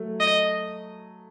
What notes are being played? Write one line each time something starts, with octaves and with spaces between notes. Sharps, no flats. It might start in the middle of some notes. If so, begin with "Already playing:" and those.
Already playing: F#3 A3
D#5